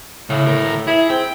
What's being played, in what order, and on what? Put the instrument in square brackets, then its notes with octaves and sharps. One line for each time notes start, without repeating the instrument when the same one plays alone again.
[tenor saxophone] A2 [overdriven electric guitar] C#3
[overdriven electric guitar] D2 A#4
[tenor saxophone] E4 [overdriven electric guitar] G#4
[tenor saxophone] C4 [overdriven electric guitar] G5